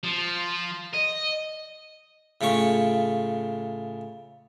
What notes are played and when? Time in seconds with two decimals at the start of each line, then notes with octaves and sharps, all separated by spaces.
0.03 F3
0.94 D#5
2.41 A2 C#3 F4 C#6